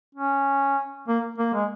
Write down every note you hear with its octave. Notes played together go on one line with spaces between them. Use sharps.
C#4
A#3
A#3
G#3